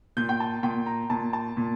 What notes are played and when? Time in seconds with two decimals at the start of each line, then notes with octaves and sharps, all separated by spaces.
0.17 A#2 G6
0.29 G5
0.40 A5
0.63 A#2 G5
0.86 A#5
1.10 A#2 A5
1.33 A5
1.57 A#2